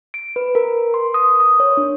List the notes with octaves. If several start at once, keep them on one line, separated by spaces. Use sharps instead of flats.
D7
B4
A#4
C6
D#6
D#6
C#5
D4